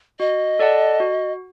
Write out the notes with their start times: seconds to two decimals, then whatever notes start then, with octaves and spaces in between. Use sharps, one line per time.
0.20 F#4 D#5
0.59 A4 D5 F#5 A5
1.00 F#4